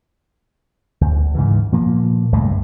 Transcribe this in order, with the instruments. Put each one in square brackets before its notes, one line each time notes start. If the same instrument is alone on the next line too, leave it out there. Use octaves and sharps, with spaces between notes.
[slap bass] D2
G#2 C#3 E3
A#2 F3 A#3
C#2 G2 G#3 A3